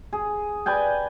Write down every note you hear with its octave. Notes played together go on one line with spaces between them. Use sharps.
G#4
B4 D5 G5 G#5